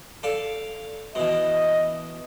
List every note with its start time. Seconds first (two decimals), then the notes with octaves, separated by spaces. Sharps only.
0.23 A4 D5 F5
1.15 B2 E3 D#5